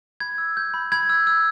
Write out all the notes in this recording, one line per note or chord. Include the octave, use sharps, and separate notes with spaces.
B5 G#6
E6
G6
B5
B5 G#6
E6
E6